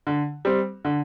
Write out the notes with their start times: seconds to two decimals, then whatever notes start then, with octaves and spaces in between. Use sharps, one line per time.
0.07 D3
0.45 G3 C4
0.85 D3